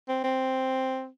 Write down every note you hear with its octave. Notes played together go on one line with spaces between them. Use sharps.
C4
C4